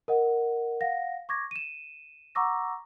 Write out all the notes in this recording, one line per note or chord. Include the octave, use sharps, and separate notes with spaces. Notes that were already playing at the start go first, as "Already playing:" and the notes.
A#4 D#5 F#5
F5 F#5 A#6
C#6 D6 G#6 A#6
D#7 E7
F#5 A#5 C#6 D6 E6 A#6